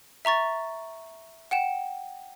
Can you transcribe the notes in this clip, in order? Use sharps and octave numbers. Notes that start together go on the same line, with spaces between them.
E5 A#5 C#6 A6
F#5 G5 E7